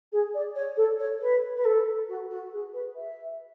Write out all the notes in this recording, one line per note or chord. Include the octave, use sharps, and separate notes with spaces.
G#4
D5
C#5
A4
C#5
B4
B4
A4
F#4
F#4
G#4
B4
E5